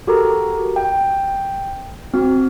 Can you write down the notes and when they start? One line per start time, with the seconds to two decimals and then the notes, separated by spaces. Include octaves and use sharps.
0.07 F#4 G4 A4 A#4 A#5
0.76 G5
2.14 C4 F#4